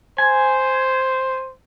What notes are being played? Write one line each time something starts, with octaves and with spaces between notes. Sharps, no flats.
C5 G#5